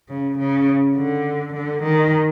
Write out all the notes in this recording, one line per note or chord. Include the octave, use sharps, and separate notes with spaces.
C#3
C#3
D3
D3
D#3